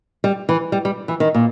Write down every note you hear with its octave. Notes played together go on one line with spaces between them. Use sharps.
G3
E3
G3
G3
E3
D#3
A#2